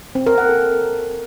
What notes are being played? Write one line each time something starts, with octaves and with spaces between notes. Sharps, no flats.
C4
A#4
F#5
A4